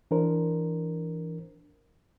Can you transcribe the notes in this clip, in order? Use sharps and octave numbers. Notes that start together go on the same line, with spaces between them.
E3 D4 A#4 C5